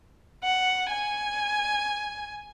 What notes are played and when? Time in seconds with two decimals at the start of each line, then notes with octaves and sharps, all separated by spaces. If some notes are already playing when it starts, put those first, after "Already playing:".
0.44 F#5
0.91 G#5